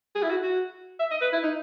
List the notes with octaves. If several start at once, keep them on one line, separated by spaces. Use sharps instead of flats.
G#4
E4
F#4
F#4
E5
D#5
B4
E4
D#4